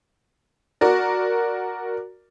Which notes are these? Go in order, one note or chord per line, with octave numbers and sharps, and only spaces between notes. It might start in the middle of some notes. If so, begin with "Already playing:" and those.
F#4 A#4 D5